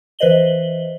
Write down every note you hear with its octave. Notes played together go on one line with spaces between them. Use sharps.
E3 B4 C5 D#5 F#7 G7